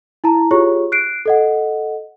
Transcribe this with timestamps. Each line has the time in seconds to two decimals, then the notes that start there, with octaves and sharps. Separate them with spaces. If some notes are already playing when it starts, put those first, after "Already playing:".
0.24 E4 A5 A#5
0.51 F4 G4 G#4 C#5 C#6
0.92 F#6 C7 D7
1.26 A4 D#5 F#5